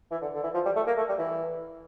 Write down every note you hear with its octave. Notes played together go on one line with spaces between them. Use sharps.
E3
D3
D3
E3
F3
G3
A3
A#3
A3
G3
E3